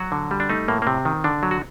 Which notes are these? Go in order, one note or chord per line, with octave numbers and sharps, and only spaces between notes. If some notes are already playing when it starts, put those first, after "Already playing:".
Already playing: F#3 F#4
D3
G3
D4
A3 D#4
A2 A#3
A#3
C3 C4
D#3
D3 D4
F#3
F#4